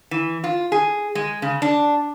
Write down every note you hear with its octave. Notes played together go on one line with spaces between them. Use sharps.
E3
F4
G#4
G#3
C#3
D4